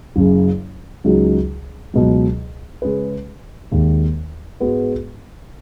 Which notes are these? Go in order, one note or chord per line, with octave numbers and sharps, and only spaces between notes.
F#1 F#2 C#3
C#2 C#3 F#3 D#4 F#4
C#2 B2 F#3
C#3 G#3 C#4 G#4 B4
D#2 D#3 G#3
G#2 G#3 B3 F#4 B4